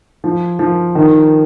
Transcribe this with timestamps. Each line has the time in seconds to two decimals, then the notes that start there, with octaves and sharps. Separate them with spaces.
0.24 F3
0.59 F3
0.95 D#3